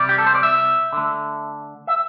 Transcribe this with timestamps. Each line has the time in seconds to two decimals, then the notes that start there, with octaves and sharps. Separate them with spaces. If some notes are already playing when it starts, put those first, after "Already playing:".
Already playing: C3 G3 D5
0.09 G4
0.18 A4
0.27 C5
0.35 D5
0.43 E5
0.93 D3 A3
1.87 E5